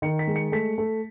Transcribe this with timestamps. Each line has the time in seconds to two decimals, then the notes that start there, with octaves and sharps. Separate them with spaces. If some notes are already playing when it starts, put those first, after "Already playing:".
0.02 D#3 C#7
0.19 B6
0.27 G#3
0.36 C#7
0.52 A3 B6
0.78 A3